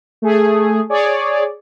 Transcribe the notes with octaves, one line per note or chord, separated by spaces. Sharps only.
A3 G#4
G#4 C#5 D5